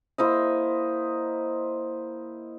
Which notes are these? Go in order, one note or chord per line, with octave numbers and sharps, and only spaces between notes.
A#3 E4 C5 D#5